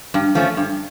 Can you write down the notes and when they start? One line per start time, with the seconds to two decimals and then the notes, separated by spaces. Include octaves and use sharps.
0.14 G2
0.35 F3 A3 C#4
0.57 G2